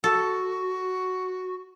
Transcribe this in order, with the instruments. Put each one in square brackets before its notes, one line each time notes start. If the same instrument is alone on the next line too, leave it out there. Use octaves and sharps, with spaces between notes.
[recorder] F#4 [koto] A4